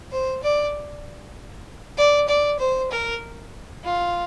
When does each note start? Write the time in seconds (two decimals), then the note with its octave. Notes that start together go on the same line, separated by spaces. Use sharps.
0.11 C5
0.43 D5
1.97 D5
2.28 D5
2.59 C5
2.91 A#4
3.84 F4